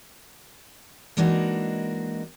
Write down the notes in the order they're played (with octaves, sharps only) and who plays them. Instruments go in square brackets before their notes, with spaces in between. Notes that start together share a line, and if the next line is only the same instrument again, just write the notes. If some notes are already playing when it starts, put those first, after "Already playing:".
[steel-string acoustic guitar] E3 G#3 A#3 D4 D#4 F#4